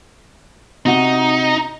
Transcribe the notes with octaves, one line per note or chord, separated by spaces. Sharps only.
C3 D#4 F#4